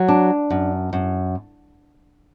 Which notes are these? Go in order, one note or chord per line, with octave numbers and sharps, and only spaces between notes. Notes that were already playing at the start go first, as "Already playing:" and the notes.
Already playing: F#3
D4
F#2
F#2